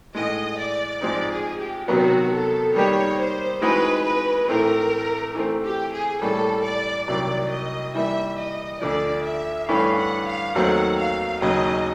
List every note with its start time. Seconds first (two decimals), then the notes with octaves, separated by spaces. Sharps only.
0.14 A2 E3 G#3 D#5
0.57 D5
1.01 G#2 F3 G#3 C4 D#4 D5
1.30 G#4
1.58 G4
1.88 C3 D#3 F#3 B3 F#4
2.32 A4
2.74 D#3 G3 A#3 D#4 G4 C#5
3.18 C5
3.61 E3 G#3 C4 D#4 F#4 B4
4.04 B4
4.48 A2 E3 A3 C4 A#4
5.35 E3 A3 C4
5.64 G4
5.93 G#4
6.21 A2 E3 G3 A#3 C#4 A4
6.64 D5
7.08 C2 C3 D#3 F#3 D5
7.51 D#5
7.95 E3 G3 A#3 E5
8.39 D#5
8.81 D2 D3 F3 D5
9.25 E5
9.69 G2 E3 A3 C#4 F5
9.98 F#5
10.27 F5
10.55 D#2 D#3 F#3 A3 C4 F#5
10.98 F5
11.41 D#2 C#3 F#3 A#3 D#5